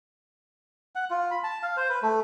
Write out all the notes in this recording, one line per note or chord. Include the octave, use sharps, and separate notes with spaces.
F#5
F4
B5
A5
F5
C5
B4
A3